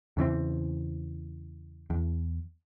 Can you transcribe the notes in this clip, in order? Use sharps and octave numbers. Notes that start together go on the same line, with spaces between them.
E2 C#3 E3 C4
E2